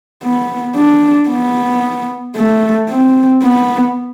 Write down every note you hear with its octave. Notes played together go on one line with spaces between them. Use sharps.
B3
D4
B3
A3
C4
B3